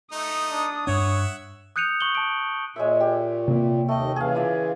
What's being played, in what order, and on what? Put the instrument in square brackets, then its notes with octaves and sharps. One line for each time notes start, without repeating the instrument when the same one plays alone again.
[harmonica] A3 D#4 [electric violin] D#6
[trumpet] D4
[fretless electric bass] G2 D4 [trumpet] C#5 [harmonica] E5 F#5
[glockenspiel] D#6 F#6 G6 C#7 D#7 F7
C#6 F#7 G7
A5 D7
[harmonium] A#2 [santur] G#3 C#5 E5
[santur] G4
[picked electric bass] C3 A#3
[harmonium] D#2 D#5 [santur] A3 G5
[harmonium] C#3 E3 [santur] G#4 F5
[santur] F4 D5 E5